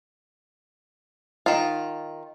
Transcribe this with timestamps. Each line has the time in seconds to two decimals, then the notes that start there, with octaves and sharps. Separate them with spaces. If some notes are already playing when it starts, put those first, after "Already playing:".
1.46 D#3 F4